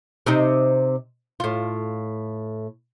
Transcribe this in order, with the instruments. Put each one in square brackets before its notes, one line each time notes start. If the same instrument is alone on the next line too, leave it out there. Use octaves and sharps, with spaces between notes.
[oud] C3 C4 D#4
A2 F4